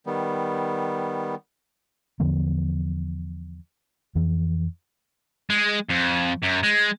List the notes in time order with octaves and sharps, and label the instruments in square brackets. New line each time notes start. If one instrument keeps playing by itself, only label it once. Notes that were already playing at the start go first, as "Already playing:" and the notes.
[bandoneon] D#3 G3 B3
[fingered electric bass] E2 D3 F3 B3
F2 E3
[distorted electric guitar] G#3
F2
F#2
G#3